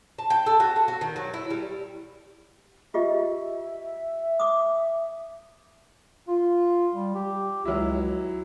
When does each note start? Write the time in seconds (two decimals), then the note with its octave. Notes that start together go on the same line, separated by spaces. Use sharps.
0.19 A5
0.30 G5
0.46 A4
0.60 F#4
0.76 F#5
0.88 F#4
1.01 D#3
1.16 F#3
1.34 E4
1.50 G3
2.94 F4 G4 D#5 E5
4.40 D6 D#6
6.28 F4
6.95 G3
7.15 G4
7.65 C#2 F#3 E4